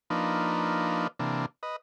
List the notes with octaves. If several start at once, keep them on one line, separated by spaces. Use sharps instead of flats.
F3 A#3 D4 D#4 B4
C3 E3 A#3 D4
B4 D#5